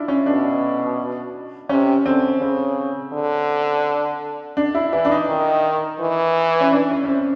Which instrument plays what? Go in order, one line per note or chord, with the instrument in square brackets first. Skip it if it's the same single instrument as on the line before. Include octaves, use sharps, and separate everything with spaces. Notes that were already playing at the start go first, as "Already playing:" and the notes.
Already playing: [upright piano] D4 E4 F4
C#4
[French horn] B2 [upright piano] D4
[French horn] C3 [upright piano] C#4
[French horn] D3 [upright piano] C4
[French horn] C#3 [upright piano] C4
[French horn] D3
[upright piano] D4
E4
[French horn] E3 [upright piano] E4
[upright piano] D4
D#4
[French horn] D#3
E3
[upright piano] C#4
D4
C#4
C#4
C4